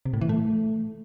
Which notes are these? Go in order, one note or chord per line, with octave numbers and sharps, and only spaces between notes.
C3
A2
E3
A3